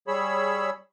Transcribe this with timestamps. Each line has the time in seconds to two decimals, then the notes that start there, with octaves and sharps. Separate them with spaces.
0.08 G3 G#4 C#5 B5 E6